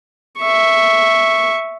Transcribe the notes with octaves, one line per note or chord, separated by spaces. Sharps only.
E5 C#6